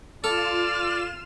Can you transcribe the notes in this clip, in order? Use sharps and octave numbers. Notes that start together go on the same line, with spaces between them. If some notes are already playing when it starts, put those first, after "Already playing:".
F4 A4 D5 F6 E7